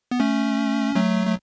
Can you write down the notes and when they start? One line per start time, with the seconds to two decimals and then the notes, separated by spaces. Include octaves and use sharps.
0.11 B3
0.20 A3 C#4
0.95 F#3 A3
1.27 A3